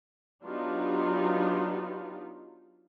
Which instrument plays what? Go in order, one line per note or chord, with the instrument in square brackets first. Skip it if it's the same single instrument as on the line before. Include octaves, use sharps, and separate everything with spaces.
[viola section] F#3 B3 D4 D#4 F4 G4